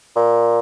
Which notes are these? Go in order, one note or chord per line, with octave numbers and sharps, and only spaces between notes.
A#2